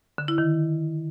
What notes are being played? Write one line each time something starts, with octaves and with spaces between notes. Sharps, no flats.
D3
E4
D#3